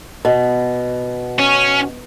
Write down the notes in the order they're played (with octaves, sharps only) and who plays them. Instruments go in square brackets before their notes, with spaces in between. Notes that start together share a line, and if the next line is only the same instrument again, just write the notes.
[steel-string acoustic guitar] B2
[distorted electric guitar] C#4